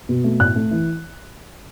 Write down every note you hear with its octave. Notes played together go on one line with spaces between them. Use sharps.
B2
A3
A2 F#6
A3
E3